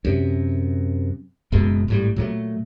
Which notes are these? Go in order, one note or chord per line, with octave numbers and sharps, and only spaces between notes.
F#2 C3
F#1 F#2 B2 G#3
G#1 A2 G3
A#2 F#3 G3 A3